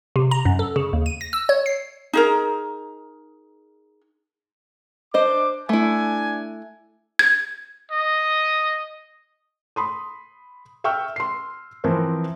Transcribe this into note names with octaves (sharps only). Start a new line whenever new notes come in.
C3
A#5
F#2
A4
C#3
D#2
D#7
A#6
E6
C#5
C7
D#4 G#4 A#4
D4 C5 D#5 D6
A3 D4 E4 G#5
G#6
D#5
B5 C6 D#6
E5 G5 C#6 E6 F6
C6 C7
E3 F3 C4 E4 A#4 C5